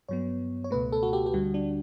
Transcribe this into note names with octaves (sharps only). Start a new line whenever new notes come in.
G2 F#3 B3 C#5
C#5
C#2 B2 A3 B4
A4
F#4
G4
G4
D2 D3 G3 F#4
D4